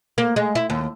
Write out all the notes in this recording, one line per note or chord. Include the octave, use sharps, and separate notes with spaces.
A#3
G#3
E4
D#2